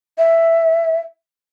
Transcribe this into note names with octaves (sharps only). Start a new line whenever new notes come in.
E5